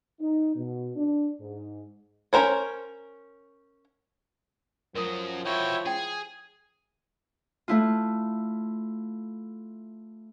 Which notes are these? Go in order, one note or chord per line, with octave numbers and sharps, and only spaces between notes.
D#4
B2
D4
G#2
C#4 E4 A#4 C5 C#5
F#2 F3 F#3 A#4 D#6
E3 E4 F#4 C#5 G5
E4 G#4 G5 G#5
A3 E4 F4